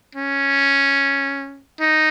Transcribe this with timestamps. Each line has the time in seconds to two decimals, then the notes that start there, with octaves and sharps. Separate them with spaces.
0.15 C#4
1.80 D#4